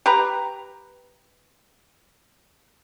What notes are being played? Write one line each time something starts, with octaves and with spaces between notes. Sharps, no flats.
G4 B4 A#5